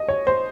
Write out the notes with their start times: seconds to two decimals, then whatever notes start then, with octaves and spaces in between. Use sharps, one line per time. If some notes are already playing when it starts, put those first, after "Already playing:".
Already playing: D#5
0.08 C#5
0.27 C5